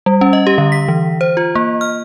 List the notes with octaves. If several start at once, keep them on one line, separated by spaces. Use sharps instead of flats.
G3
C#4
D#5
G4
D3
B6
E3
C5
F4
A#3
F6